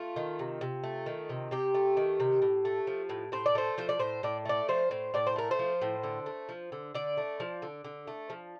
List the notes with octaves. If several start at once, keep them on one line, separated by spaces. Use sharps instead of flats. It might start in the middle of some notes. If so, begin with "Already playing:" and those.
Already playing: A3 F4
D#3
C3
C3
A3
D#3
C3
C3 G4
A3
D#3
C3
A2
A3
F3
A2
A2 C5
D5
A3 C5
F3 C5
D5
A2 C5
A2 D5
A3 D5
F3 C5
A2
A2 D5
C5
A3 A#4
C5
F3
A2
D3
A3
F3
D3
D3 D5
A3
F3
D3
D3
A3
F3